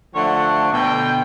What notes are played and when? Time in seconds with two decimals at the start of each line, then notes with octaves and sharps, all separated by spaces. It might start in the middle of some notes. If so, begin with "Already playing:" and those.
0.15 D3 F3 A3 C#5 F#5
0.71 B2 D3 G5